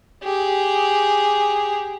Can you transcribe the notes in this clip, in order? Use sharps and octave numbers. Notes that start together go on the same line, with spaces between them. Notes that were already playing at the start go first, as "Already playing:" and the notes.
G4 G#4